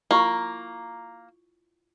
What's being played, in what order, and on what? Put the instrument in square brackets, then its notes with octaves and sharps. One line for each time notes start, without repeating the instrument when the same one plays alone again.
[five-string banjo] A#3 [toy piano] E4 F4 C#6